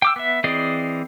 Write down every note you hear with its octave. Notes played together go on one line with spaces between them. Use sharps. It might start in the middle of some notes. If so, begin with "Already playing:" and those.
G5 D6 E6
B3 E5
E3 C4 G#4 D5 D#5